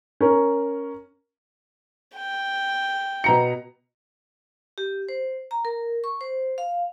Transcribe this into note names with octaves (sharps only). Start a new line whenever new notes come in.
C#4 A#4
G5
B2 A#5 C#7
G4
C5
A#5
A#4
C#6
C5
F5